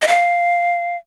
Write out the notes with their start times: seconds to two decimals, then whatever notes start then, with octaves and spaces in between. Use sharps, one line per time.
0.02 D#5
0.08 F5